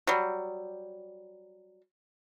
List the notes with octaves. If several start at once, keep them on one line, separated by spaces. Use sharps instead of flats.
F#3 G3